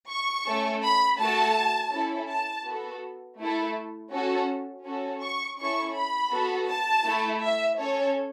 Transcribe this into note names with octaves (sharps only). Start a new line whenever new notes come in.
C#6
A3 C#4 A4
B5
A3 F#4 A4 A5
C#4 E4 A4
A5
B3 F#4 A4
A3 E4 A4
C#4 F#4 A4
C#4 F#4 A4
C#6
C#4 E4 A4 C#6
B5
B3 F#4 A4
A5
A3 E4 A4
E5
C#4 A4 C#5